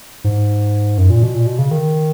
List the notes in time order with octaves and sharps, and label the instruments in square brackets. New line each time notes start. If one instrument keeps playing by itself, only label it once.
[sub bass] G#2
F#2
A#2
B2
A#2
B2
C#3
D#3